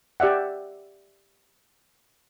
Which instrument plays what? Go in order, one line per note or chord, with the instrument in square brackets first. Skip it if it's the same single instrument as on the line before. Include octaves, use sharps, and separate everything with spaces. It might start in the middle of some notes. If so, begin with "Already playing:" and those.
[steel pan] G4 D5 E5 F#5